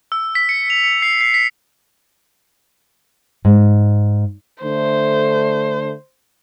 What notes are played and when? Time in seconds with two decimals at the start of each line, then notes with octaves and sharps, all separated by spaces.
0.12 E6
0.35 B6
0.49 C#7
0.70 F7
0.84 C#7
1.02 C7
1.21 C7
1.34 B6
3.45 G#2
4.63 D3 A3 C5